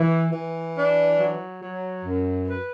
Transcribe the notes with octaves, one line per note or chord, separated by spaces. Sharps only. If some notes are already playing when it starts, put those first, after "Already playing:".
Already playing: E3
E3
D4
F#3
F#3
F#2
B4